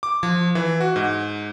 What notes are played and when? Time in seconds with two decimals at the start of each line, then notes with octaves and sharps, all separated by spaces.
0.03 D6
0.23 F3
0.55 E3
0.80 F#4
0.96 G#2